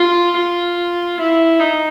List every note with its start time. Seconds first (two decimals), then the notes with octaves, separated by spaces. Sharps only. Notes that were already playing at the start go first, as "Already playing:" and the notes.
Already playing: F4
0.37 F4
1.20 E4
1.60 D#4